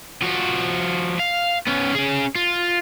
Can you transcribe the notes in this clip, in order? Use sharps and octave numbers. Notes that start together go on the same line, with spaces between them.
F3 F#4
F5
B3 C#4
C#4 G#4
F4